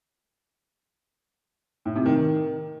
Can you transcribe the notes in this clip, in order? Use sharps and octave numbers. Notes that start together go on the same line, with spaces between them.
A2
C3
D#3
D#3